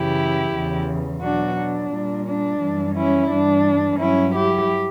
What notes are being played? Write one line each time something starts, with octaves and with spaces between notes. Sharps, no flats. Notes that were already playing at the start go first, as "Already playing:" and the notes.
Already playing: F#2 C#3 E3 E4 G4
E2 C#3 E3
B2 F#3 D4 F#4
D4
A#2 G3
D4
F#2 E3 G3
C#4 E4
G2 E3 G3 D4
G2 F#3 C#4 E4
E4 G4